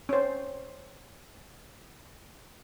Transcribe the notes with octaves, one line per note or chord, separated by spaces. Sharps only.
C#4 C5